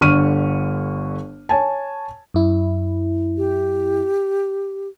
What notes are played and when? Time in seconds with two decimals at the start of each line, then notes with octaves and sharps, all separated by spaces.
0.01 G1 D3 C#6 F6 D#7
1.49 C#5 G#5 A5
2.34 F#2 E4
3.37 G4